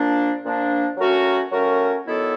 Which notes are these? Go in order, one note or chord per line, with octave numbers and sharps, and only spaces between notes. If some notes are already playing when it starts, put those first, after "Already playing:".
Already playing: A#2 F3 A#3 D4
A#2 F3 A#3 D4
F#3 A3 C#4 F#4 A#4
F#3 A3 C#4 F#4 A#4
D#3 F#3 B3 E4 A4